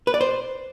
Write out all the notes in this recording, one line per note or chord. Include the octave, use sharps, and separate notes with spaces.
B4
D5
C5